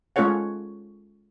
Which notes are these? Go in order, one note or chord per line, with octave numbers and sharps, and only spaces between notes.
G#3 C#4 F4 A4 C#5 F#5